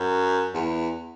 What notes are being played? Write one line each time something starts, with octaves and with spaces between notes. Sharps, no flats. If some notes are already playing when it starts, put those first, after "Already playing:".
Already playing: F#2
E2